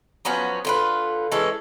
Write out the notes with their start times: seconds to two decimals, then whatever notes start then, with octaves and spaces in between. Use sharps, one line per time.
0.25 F3 F#3 B3 C#4
0.65 D3 F4 B4
1.31 E3 G#3 C#4 A4